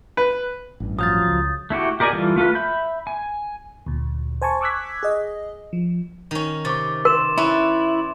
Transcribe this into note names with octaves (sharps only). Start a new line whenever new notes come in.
B4
A1 G2
F3 F#3 F5 D#6 G6 A6
C#2
A3 E4 F#4 G4
G4 A#4 D5 D#5 G#5
E3 G3 F4 A4
A3 F4 A4 B4
E5 B5 G6
G#5
D2 A#2
C5 G#5 A5 C#6
C#6 D6 E6 F#6 G#6 B6
G#4 D#5
F3
D#3 C#4
C3 C#6 D6 A6
A#4 C6 E7
C#4 E4 A4 B4